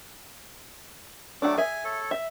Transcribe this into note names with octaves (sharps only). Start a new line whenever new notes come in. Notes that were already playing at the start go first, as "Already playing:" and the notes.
F#3 A3 D4 F#5 D6
G#4 E5 G#5
A4 C#5
E5